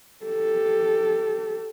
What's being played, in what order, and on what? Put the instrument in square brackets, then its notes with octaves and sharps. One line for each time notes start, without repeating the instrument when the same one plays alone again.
[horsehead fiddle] G4 A4